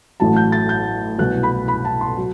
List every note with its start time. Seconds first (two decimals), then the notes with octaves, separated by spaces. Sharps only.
0.20 A1 A2 F#3 A5
0.36 G6
0.52 A6
0.69 G6
1.19 C2 B2 F#3 F#6
1.43 B5
1.68 B5
1.85 A5
2.01 C6
2.18 F#3